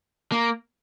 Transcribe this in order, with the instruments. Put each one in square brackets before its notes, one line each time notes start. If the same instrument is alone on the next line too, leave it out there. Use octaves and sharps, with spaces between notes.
[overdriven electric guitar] A#3